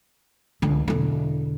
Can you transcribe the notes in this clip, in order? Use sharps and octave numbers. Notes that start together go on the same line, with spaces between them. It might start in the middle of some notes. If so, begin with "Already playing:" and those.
C#2 D3
E1 D3